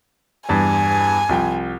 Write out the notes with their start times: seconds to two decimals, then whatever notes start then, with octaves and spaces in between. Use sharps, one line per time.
0.49 E2 G2 G#5
1.29 C2 F3 G5